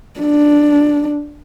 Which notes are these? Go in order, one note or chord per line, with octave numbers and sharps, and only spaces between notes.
D4